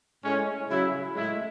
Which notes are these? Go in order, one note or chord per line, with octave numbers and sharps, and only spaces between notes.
A2 G#3 C#4
C#3 F#3 E4
A2 G#3 E4